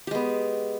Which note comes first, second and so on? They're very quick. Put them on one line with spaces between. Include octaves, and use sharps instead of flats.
G4 G#3 B3